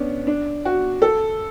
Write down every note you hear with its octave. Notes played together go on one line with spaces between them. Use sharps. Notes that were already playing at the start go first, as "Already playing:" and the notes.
Already playing: B3 C#4 D4
D4
F#4
A4